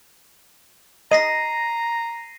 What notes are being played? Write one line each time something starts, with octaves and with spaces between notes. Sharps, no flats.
D#5 A#5 A#6 C7 D#7